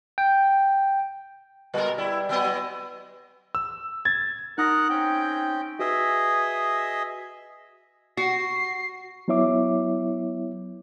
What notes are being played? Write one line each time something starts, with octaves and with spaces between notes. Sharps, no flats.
G5
B2 G3 G#3 A#4
G3 E4
F#3 B3 D#5
E6
G#6 A6
D#4 A#4 F#5 D#6 F#6 A#6
C4 C#4 G5
F#4 G#4 B4 D#5 E5 E6
F#4 C7
F#3 B3 E4 C#5 E5 D6